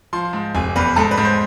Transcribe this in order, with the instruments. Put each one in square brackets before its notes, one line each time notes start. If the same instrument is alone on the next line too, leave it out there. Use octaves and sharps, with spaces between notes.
[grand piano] F3 C6
G#2
F1 G#5
E2 B4
G#2 A4
B4
G#2
C5